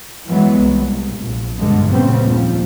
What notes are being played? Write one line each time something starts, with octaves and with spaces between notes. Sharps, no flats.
E3 F#3 G#3 B3
C2
A#1
B1 G2 D3 G#3
A#2 C#3 F#3 G3 B3 C4
D#2 F3